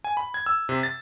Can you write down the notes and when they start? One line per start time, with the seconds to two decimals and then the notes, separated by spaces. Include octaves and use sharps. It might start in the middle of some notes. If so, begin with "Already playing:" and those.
0.04 G#5
0.17 B5
0.34 G#6
0.46 E6
0.69 C3
0.83 A6